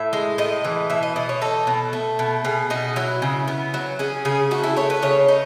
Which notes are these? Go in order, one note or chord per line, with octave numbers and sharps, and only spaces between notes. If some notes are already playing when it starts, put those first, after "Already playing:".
Already playing: A2 E5
G#3
A2 D#5
E3
B2 E5
D#5
B2 D#5
C#5
D#4 A4
B2
A3
B2
B2 G#4
B2 D#4
F#3 E4
C#3
B3
F#3
C#4 G#4
C#3 G#4
A3 F#4
E4
A3 C#5
B4
C#3 C#5
D#4